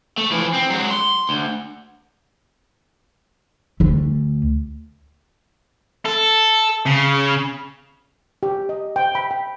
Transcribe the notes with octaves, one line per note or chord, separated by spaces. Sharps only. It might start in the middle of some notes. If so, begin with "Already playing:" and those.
A3
E3 F3
C4
F#3 G#3
C6
D2
D2 A3
A4
C#3
G4
D#5
G5
B5
G5